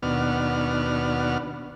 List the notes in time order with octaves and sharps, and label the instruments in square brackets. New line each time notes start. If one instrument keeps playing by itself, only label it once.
[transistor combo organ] D#2 B2 B3 D4 F#4 F6